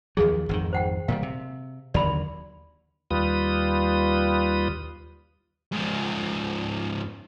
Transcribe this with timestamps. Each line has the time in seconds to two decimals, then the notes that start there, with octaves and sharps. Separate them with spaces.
0.17 D#2 F3 F#3 G#4
0.49 G#1 F2 D#3
0.73 C5 F#5 G5
1.08 A#2 D#3 G3 F5
1.23 C3
1.94 D#2 D3 F#3 D5 B5 C6
3.11 D#2 G3 F4 B4 D#6
5.72 G#2 F3